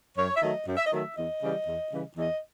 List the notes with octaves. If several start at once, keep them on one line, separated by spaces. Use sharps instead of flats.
F#2 C#5
E5
D#3 F#3 A3 D#5
F#2
E5
D#5
D#3 F#3 A3 E5
E2 D#5
C#3 E3 G3
E2
C#3 E3 G3
E2 D#5